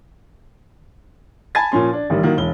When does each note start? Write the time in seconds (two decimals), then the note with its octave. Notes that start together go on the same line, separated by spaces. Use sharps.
1.55 G#5 A5 B5 G#6 A6
1.72 A#2 F3 C#4 C6
1.93 D4
2.10 A1 D#3 G3
2.23 D#3 F#3 A#3
2.37 E1 G7